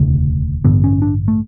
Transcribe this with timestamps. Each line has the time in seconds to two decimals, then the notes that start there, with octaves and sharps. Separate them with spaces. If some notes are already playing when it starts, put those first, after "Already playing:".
Already playing: E1 D2 C#3 A3
0.64 A1 G2 D3 B3
0.84 C#4
1.02 D4
1.28 A3